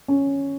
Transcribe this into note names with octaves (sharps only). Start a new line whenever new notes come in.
C#4